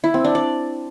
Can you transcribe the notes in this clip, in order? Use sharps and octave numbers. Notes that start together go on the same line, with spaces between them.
E4
C4
D4
D5